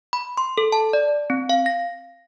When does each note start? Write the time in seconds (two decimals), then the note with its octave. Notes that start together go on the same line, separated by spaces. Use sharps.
0.13 B5
0.37 C6
0.58 A4
0.72 A5
0.93 D5
1.30 C4
1.49 F5
1.66 A#6